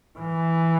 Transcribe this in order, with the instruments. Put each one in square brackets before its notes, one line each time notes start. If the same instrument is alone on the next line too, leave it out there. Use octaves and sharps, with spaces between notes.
[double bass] E3